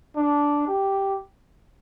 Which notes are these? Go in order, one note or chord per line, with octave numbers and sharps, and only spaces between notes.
D4
G4